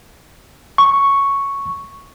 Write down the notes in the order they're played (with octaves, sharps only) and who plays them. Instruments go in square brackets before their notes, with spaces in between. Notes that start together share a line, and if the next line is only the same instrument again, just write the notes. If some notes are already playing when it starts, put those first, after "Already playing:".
[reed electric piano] C#6